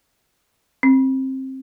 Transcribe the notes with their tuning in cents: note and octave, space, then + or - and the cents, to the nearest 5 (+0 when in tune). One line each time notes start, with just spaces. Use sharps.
C4 +20